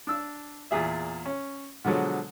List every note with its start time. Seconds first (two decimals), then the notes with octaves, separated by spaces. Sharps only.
0.07 D4 E6
0.71 E2 A#2 G#4 E5
1.26 C#4
1.84 B2 D3 F3 F#3 G#3